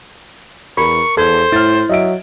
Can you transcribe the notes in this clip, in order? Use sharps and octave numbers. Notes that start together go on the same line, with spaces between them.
E2 A#4 B5 C#6
E2 A4 C5 G#6
A2 E4 F6 A6
F#3 D#5 E5 D7